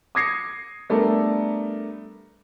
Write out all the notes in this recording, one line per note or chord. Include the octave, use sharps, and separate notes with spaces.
D6 D#6 G#6 A#6 C7 C#7
G3 A3 B3 D4 A4 A#4